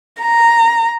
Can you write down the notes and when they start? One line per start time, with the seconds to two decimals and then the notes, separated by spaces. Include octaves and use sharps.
0.22 A#5